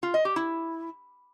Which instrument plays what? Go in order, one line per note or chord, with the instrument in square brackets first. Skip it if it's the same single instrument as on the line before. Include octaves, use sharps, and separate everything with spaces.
[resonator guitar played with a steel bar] F4
D#5
G4
E4